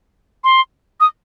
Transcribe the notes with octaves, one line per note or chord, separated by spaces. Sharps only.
C6
D#6